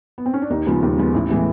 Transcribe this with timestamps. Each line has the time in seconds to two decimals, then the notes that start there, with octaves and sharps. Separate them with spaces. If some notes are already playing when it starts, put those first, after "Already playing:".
0.18 B3
0.26 C4
0.34 C#4
0.42 D4
0.50 D#2 D#4
0.66 C#3 F3 G#3 B3
0.82 D#2
0.98 C#3 F3 G#3 B3
1.14 A1 E4
1.30 A2 E3 G#3 B3